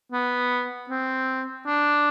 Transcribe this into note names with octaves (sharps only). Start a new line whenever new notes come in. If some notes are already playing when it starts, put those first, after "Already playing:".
B3
C4
D4